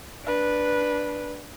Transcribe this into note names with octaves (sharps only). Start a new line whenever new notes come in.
D4 B4